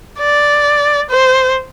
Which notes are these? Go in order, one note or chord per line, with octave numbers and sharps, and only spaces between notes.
D5
C5